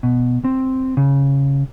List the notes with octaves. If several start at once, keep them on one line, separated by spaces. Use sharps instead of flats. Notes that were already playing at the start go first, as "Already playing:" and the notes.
B2
C4
C#3